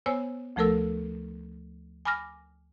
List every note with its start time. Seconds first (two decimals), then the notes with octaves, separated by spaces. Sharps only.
0.06 B3 C5 C#5 G#5 E6
0.56 D2 F3 A3 A4 A#4 E6
2.05 G#5 B5 D6 F6 A#6